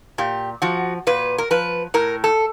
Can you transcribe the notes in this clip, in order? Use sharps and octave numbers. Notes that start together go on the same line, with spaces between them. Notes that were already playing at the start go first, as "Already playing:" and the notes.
A#2 G4
F3 F#4
A#2 B4
A#4
F3 B4
A2 A#4
A4